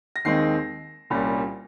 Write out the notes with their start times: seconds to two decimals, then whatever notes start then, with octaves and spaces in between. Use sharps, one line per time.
0.16 A#6
0.25 D#2 D#3 G#3 C4 D#4 C7
1.10 C2 A#2 G3 C#4